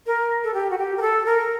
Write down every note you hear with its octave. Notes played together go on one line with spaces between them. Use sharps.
A#4
A4
G4
F#4
G4
A#4
A4
A#4